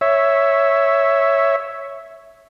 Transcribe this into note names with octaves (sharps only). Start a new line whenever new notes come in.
C#5 E5